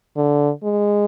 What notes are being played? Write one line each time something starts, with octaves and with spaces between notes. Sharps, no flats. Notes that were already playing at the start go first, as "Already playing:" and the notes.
D3
G#3